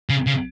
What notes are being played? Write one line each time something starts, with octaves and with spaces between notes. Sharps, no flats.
C#3
C#3